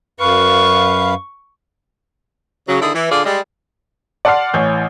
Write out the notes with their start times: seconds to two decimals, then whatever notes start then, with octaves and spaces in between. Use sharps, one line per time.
0.20 F#2 B4 F5 C#6
2.68 C#3 F#3
2.81 D3 D#3 E4 G#4
2.94 E3
3.11 D3 F4 G#4 D5
3.25 G3 G#3
4.25 D5 F#5 A5 C6 F6 C7
4.54 A1 E3 C#5 G6